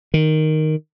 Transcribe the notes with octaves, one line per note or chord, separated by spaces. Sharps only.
D#3